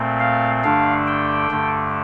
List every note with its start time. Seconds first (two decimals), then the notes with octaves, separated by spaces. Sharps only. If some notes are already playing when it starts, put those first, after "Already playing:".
Already playing: A#2 A3 C4
0.20 F5
0.64 G2 D3 A3 D4 F5
1.07 G5
1.51 G2 D3 A3